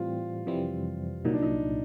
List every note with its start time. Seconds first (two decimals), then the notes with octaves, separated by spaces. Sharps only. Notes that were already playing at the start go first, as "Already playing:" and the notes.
Already playing: A2 E3 G3 C4 F4
0.46 F2 C3 E3 G3 C4
1.25 C2 A#2 F#3 D#4
1.34 D4
1.42 D#4